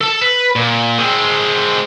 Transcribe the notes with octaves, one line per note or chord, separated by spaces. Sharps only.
A4 A5
B4
A#2
G#3 C4